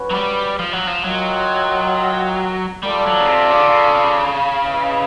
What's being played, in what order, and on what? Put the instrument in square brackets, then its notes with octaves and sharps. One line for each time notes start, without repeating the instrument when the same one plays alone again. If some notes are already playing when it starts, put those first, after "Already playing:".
Already playing: [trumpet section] C#4 F#4 B4
[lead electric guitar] F#3
G3
F3
F#3
F3
[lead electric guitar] F#3 [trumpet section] F4 A#4 D#5 G5
[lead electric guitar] G3 [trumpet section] F4 A4 D5
[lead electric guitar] F#3
C#3
C3
C#3
D3
C#3
[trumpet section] E4 G#4 B4 D#5